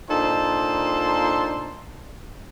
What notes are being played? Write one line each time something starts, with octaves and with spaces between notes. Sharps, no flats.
A#2 D4 D#4 A4 C5 C6